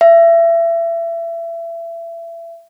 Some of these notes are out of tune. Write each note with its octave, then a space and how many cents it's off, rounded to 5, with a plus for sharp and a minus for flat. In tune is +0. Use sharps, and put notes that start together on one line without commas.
E5 +30